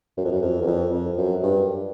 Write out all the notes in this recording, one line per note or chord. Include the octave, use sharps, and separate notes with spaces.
F#2
F2
F#2
F2
E2
F2
F2
F#2
G2